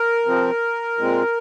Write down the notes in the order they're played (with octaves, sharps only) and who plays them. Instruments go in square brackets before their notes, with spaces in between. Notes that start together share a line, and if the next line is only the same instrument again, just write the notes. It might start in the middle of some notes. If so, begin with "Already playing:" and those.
Already playing: [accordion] A#4
C3 F3 C4
A#2 G#3 C4